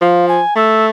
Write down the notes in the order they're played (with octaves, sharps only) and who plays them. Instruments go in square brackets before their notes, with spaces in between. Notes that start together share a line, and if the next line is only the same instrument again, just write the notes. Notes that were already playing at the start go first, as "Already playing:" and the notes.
[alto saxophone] F3 [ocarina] F5
[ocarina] G#5
[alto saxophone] A3 [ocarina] E6